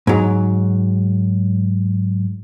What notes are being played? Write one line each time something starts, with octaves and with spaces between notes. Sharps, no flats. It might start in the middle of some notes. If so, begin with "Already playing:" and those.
G#2 F#3